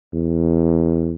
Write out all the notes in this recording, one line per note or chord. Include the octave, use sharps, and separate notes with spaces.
E2